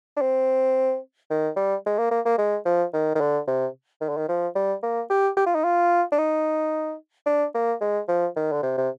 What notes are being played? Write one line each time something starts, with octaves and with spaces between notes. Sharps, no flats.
D4
C4
D#3
G3
G#3
A#3
A#3
A#3
G#3
F3
D#3
D#3
D3
C3
D#3
D3
D#3
F3
G3
A#3
G4
G4
F4
D#4
F4
D4
D#4
D4
A#3
G#3
F3
D#3
D3
C3
C3